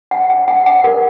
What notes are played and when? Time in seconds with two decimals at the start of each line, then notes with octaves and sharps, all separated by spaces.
0.11 F#5
0.30 F#5
0.48 F#5
0.66 F#5
0.84 A#4